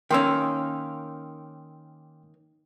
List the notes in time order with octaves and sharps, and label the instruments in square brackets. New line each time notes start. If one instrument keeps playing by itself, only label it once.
[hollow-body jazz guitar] D#3 A#3 C#4 [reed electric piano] G5 C6 E6